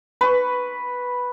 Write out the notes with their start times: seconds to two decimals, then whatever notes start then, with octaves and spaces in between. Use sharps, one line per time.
0.21 B4 C#6